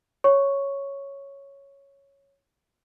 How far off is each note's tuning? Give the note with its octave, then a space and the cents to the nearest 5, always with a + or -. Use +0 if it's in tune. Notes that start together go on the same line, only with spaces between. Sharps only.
C#5 +0 C#6 +0